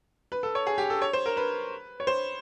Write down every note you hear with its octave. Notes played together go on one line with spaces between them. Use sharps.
B4
A4
C#5
G#4
G4
A4
C#5
C5
A#4
B4
C#5
C5